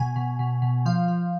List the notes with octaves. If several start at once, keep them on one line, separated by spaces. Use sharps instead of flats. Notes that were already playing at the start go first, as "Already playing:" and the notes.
Already playing: B2 G#5
B2
B2
B2
F3 F5
F3